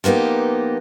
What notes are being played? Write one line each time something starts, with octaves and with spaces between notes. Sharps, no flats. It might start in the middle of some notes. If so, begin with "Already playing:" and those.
F3 A#3 B3 D#4 G4